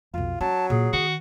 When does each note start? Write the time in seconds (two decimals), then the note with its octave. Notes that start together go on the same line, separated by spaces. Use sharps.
0.14 B1 F2 F4
0.41 F#3 C#4 A5
0.70 A#2 G#4
0.93 D#3 F#4